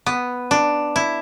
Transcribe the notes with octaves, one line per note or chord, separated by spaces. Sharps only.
B3
D4
E4